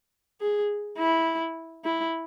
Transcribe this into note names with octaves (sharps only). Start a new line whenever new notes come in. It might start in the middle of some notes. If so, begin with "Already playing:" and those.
G#4
E4
E4